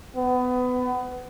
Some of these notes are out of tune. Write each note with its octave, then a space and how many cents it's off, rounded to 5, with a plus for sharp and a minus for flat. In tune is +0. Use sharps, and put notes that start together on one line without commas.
B3 +25